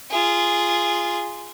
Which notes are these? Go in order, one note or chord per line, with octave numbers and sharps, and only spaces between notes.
F4 G#4